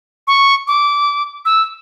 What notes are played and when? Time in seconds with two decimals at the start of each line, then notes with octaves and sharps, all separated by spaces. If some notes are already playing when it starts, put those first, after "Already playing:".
0.27 C#6
0.68 D6
1.45 E6